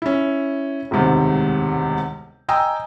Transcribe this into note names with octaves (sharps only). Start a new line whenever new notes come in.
C#4 E4
E1 D2 G#2 C3 D#3
D#5 G5 G#5 A#5 D#6 E6